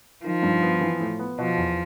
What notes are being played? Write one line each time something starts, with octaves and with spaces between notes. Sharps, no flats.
D#3 F3
G2
B3
E3
A2
B3
B2 F3
E2